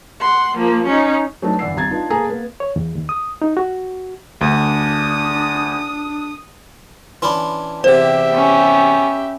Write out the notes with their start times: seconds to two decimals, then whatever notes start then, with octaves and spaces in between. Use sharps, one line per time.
0.20 F#5 C6
0.56 F3 A#3
0.86 C#4 D#4
1.42 F#3 A3 B3 D4 D#4
1.59 G1 E3 D5 F#5 E6 C7
1.74 G#1 E2 G3 A#5 G#6 A6
1.91 B3 D4 D#4 F4
2.10 A#3 B3 G#4 A4 G#5 A#5
2.27 A#3 B3
2.60 C#5
2.76 E2
2.95 D#2
3.09 D#6
3.42 D#4
3.57 F#4
4.41 D2 D4 D#6
7.22 E3 C#4 D4 B5 C6
7.84 E2 C3 G4 C5 E5
8.31 B3 C#4